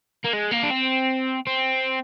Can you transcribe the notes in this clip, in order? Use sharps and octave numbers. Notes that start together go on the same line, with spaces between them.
A#3
G#3
A#3
D4
C4
C4